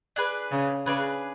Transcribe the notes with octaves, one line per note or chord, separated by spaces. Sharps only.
D4 G#4 B4
C#3
C#3 D4 G#4 B4